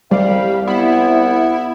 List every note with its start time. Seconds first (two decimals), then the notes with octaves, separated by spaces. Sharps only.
0.11 C2 G3 F5
0.67 B3 E4